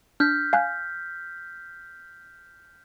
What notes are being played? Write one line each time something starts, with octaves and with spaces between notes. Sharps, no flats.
D4 F6 G6 B6
F5 G#5 F#6